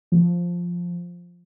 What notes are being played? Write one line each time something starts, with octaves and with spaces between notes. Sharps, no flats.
F3